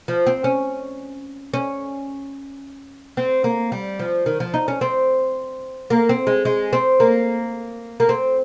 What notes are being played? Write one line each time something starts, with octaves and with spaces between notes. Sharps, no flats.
F3
C4
C#4
C#4
C4
A#3
G3
F3
D#3
F3
D#4
C#4
C4
A#3
C4
G#3
G#3
C4
A#3
A#3
C4